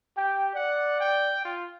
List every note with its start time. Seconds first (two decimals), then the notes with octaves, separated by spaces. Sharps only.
0.17 G4 G5
0.55 D5 F#5
1.00 G5
1.45 F4